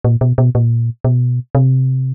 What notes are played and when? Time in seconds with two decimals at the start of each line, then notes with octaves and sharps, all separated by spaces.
0.05 A#2
0.21 B2
0.38 B2
0.55 A#2
1.05 B2
1.55 C3